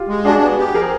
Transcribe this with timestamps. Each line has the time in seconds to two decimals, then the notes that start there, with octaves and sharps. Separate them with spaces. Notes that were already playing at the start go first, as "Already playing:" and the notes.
Already playing: F4 G4
0.08 G#3
0.25 D4 F#4 G#4
0.42 B3
0.58 G4
0.74 F3 G#4 A#4